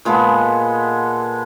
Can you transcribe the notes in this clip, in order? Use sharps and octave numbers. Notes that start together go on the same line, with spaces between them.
A#2 G#3 B3 A4